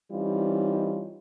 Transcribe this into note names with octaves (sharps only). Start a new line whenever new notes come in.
E3 G3 C4 C#4 D#4 F4